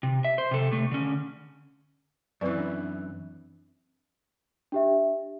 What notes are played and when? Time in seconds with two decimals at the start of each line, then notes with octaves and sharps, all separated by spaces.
0.03 C3
0.25 E5
0.38 C5
0.51 C3 A4
0.71 C3 A3
0.92 D3 C#4
2.41 F#2 E3 C4 B4 D5
2.59 D4
4.72 D4 G4 E5